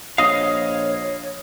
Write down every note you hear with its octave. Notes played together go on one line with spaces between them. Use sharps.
A#1 C#5 D#5 F5 D#6